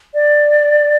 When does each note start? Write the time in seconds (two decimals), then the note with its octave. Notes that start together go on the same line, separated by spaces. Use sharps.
0.14 D5